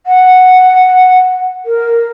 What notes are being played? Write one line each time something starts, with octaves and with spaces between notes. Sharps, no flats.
F#5
A#4